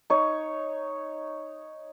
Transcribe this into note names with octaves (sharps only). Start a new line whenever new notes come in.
D#4 C#5